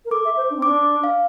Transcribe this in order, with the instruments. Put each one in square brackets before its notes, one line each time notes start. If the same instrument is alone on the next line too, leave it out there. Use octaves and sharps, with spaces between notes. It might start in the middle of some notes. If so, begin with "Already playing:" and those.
[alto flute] A#4
[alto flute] A4 [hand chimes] D6
[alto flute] E5
C5
D4
C4
[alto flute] D4 [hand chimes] D6
[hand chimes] F5